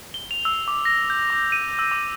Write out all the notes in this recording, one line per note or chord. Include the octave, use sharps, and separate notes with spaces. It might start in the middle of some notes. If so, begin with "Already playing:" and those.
G7
F7
E6
D6
A#6
G6
D6
D#7
E6
D6